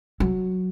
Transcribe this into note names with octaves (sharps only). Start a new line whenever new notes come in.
F#3